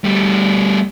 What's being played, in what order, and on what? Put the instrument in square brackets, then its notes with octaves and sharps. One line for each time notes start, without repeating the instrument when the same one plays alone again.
[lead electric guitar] G3 A3